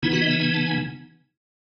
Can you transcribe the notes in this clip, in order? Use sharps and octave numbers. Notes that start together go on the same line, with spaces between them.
C#3 E3 B3 D#4 E4
F#4
D#5
E5
G#5
A5
G#5